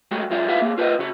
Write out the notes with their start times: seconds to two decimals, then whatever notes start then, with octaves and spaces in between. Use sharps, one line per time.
0.11 G#3 A3 F#4 G4
0.30 G#2 F#3 F4 D5 E5
0.48 E4 F4 G4 B4 E5 F5
0.62 A#3 G4 G#4
0.78 F4 B4 C5 D#5
0.99 C#3 F#4